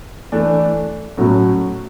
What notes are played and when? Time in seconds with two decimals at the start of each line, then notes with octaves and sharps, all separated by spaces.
0.32 E3 A3 D4
1.17 A2 F#3 A3 C#4 F#4 A4